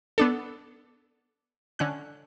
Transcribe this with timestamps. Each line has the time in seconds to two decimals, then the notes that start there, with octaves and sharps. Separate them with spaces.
0.18 B3 D4 A4
1.79 D3 C#4 F#6